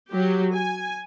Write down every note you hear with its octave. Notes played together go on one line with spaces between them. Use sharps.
F#3 G4
G#5